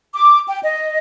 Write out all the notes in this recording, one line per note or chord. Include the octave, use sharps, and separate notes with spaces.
D6
G5
D#5